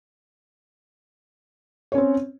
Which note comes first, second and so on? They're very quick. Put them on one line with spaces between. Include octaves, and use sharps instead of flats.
C#5 C#4 C4